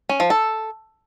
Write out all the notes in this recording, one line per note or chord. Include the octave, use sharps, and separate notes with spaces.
C#4
F3
A4